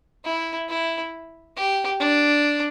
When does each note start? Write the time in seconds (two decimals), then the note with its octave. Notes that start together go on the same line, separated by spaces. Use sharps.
0.25 E4
0.69 E4
1.56 G4
2.00 D4